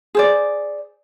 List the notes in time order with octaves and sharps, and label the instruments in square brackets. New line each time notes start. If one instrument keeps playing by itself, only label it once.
[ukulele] G#4 C5 D5